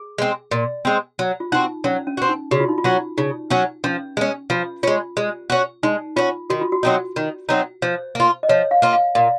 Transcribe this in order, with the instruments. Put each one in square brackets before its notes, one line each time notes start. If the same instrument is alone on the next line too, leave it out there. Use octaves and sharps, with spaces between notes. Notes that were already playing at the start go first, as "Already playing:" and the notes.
Already playing: [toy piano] G#4
[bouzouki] G#3 C4
A#2
G#3 C4
F#3
[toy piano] F4
[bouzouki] C4 F#4 [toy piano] D#4
[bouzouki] F#3 [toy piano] C#4
[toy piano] C#4
[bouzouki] C4 F#4
[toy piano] D#4
[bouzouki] C#3 [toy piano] F#4
[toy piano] F4
D#4
F4
[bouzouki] F#3 C#4 F#4
[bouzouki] C#3 [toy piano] D#4
[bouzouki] F#3 C#4 F#4
[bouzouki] F3 [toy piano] C#4
[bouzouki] G#3 C#4
[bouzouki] F3 [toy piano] F4
[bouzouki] G#3 C#4 [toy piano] F4
[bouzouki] G#3
C#4 F#4
[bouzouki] G#3 [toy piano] D#4
[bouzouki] C#4 F#4 [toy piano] F4
[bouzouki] D#3 [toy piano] F#4
[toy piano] F4
F#4
[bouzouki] F#3 C4 D#4
D#3
F#3 C4 D#4
[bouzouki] F3 [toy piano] C5
[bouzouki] A#3 F4
[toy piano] D#5
[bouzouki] F3 [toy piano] C#5
[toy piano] F5
[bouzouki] A#3 F4
[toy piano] F5
[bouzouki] A#2 [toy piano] F5